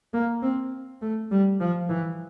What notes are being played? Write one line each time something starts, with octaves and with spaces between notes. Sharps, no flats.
A#3
C4
A3
G3
F3
E3